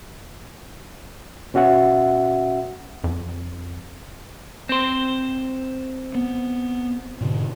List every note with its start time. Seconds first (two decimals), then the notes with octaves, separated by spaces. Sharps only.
1.54 B2 C#4 F#4 E5 F#5
3.04 F2
4.69 C4 C5
6.15 B3
7.21 G#2 B2 D3